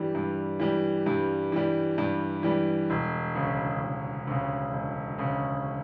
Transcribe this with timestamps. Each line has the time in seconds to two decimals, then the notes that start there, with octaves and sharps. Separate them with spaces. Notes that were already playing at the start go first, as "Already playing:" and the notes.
Already playing: G2 E3 G3
0.15 G2
0.59 E3 G3
1.06 G2
1.52 E3 G3
1.98 G2
2.43 E3 G3
2.90 E1
3.35 D2 C#3
3.81 E1
4.27 D2 C#3
4.72 E1
5.18 D2 C#3